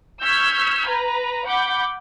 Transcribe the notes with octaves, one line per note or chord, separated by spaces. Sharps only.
C#6 E6 F6 G6 G#6 B6
B4 A#5
F#5 B5 D6 G6